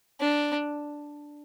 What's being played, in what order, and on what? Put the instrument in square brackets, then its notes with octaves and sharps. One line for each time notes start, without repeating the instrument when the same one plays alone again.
[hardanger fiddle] D4